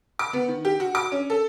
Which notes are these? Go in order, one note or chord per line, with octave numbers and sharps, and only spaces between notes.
D6
B3
D#3
G4
F#4
D6
C#4
A4